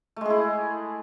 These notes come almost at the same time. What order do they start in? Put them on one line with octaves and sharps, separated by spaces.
A3 G#3 G#4 E4